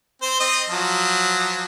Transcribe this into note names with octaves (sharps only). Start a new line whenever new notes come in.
C4 C5
C4 D#5
F3 F#3